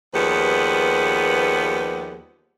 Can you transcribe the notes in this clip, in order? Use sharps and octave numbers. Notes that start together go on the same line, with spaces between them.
D#2 F3 G3 B3 G#4 B4